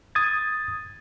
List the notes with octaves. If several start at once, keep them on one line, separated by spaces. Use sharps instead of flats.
D#6 G#6 A6